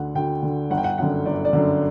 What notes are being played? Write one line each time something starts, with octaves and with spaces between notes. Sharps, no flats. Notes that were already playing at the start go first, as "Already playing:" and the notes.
Already playing: D2 D3 F#5
D2 G5
D3
G1 F#5
G5
F#5
F#2 D3 F#5
G1 D5
D5
F#2 D3